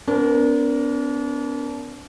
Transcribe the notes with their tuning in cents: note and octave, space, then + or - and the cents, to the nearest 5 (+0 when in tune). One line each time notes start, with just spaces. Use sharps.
B3 +35 D4 -35 A#4 +0